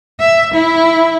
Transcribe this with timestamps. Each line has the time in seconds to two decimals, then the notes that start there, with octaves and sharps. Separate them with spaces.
0.20 E5
0.54 E4